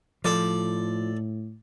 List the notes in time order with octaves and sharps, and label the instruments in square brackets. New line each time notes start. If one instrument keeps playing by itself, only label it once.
[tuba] A2 [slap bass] F3 [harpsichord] A4 D5